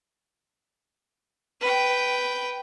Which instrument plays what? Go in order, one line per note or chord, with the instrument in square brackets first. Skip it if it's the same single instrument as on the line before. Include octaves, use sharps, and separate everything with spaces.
[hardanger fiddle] B4 G5